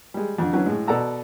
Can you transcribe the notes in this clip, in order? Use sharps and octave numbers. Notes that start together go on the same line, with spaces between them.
G3 G#3
F2 D3
D3 E3 F#3 C#4
A2 G#3
B2 A4 D5 F#5 A#5 E6